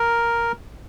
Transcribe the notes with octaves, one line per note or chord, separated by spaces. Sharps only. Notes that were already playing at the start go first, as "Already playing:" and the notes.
Already playing: A#4